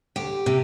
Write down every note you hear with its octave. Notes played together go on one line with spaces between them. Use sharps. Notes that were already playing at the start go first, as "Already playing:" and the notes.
D2 G4
C3